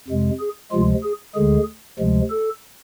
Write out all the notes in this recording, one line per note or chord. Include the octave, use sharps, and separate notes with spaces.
F2 C3 G#3
G#4
D2 C3 F3 G#3 F4
G#4
D2 D3 G#3 G#4
D2 C3 F3 G#3
A4